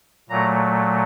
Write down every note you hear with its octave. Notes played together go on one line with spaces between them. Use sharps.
A#2 F#3 A3 A#5